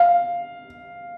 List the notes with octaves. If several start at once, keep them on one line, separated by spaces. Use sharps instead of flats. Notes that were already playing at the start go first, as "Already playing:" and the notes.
Already playing: F5